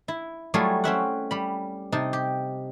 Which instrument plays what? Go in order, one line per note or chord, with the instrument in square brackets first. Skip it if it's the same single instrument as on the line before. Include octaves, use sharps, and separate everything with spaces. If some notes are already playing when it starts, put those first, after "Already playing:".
[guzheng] E4
F#3 G3 A3 E4 F4 G#4
C4 C#4 E5 F#5
G3 B5
C3 D#4 A5
G4